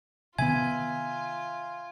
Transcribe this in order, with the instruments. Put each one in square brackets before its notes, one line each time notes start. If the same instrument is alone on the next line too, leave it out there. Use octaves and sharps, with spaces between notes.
[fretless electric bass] C3 D#3 B3 [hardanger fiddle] F4 [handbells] E5 G#5 [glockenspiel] G#6